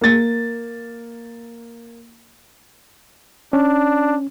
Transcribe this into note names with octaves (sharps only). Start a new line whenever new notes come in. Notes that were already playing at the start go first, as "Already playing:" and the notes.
A#3 A6
C#4 D4